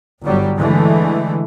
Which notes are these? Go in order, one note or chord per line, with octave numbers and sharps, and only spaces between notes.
G1 F#3 G3
D3 E3 G#3 A3